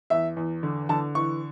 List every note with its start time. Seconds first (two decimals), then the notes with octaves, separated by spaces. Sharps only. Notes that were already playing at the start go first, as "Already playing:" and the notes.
0.10 E2 E5
0.37 E2
0.63 D3
0.89 D3 A5
1.15 E3 C#6